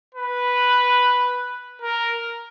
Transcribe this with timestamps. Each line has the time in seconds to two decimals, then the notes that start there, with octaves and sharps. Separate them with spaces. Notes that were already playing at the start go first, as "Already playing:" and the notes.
0.15 B4
1.82 A#4